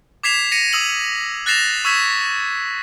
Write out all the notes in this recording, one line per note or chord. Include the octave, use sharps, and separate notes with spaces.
D6 G#6 B6 C7 E7 F7
A#6 C#7 D#7
D#6 E6 F#7
F#6 A6 A#6 C7 E7 F7
C#6 E6 G#6 B6 E7